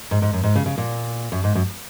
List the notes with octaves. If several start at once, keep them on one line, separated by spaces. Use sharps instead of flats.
G#2
G#2
F#2
G#2
C#3
C#3
A#2
F#2
G#2
F#2